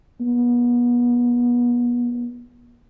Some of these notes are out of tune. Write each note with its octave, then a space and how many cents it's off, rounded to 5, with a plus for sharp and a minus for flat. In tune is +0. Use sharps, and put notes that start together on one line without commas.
B3 -35